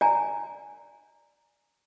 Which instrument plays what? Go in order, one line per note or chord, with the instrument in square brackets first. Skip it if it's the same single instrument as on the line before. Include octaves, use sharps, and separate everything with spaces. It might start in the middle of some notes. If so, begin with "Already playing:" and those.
[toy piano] D5 G#5 A#5